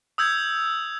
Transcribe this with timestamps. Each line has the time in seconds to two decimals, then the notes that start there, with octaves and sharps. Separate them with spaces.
0.18 D#6 E6 G6 G#6